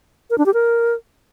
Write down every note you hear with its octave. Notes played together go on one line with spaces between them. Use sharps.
A#4
D4
G4
A#4